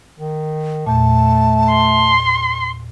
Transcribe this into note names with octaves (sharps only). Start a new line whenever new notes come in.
D#3
E2 A#2 A3 A5
C6